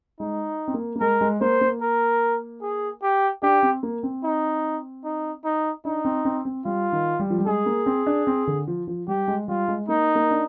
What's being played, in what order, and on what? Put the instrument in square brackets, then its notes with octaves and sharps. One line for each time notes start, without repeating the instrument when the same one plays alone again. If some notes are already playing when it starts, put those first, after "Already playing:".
[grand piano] G#3 [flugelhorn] D#4
[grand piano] C4
A#3
A#3
[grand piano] G#3 [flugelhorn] A#4
[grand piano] G#3
[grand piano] A#3 [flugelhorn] C5
[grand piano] A#3
[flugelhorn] A#4
G#4
G4
[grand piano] D4 [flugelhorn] G4
[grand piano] C4
A#3
C4
[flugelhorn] D#4
D#4
D#4
[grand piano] D4 [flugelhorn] D#4
[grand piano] C4
C4
C4
[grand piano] G3 [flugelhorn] F4
[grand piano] D#3
G3
F3
G3
[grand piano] G#3 [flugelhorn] G#4
[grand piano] A#3
C4
D4
C4
D3
F3
F3
[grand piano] G3 [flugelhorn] G4
[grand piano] G#3
[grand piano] G3 [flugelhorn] F4
[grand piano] G#3
[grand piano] A#3 [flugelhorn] D#4
[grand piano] A#3
D4